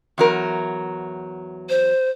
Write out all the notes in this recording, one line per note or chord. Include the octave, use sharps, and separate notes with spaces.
E2 F#3 A#4
C5